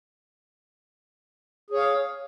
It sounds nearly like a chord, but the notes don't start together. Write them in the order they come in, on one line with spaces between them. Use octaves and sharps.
G#4 C#5 F5